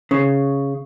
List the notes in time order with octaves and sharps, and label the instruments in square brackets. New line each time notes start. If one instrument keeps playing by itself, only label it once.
[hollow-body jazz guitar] C#3